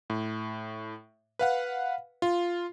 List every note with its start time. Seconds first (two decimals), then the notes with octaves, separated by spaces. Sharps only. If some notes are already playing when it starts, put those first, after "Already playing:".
0.10 A2
1.39 B4 F5 F#5
2.22 F4